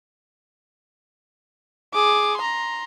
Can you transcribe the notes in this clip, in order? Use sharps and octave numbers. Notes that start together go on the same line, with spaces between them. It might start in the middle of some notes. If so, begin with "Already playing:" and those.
G#4 D6
A#5 C6